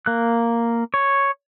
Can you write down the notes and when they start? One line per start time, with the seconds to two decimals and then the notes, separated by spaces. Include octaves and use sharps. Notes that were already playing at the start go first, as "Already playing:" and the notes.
0.06 A#3 F#6
0.94 C#5